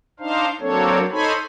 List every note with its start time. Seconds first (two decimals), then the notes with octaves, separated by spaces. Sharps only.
0.20 D4 D#4 C5 F5
0.61 F#3 A#3 C4 D4 A4 C#5
1.11 D#4 A4 C5 C#5 G#5 B5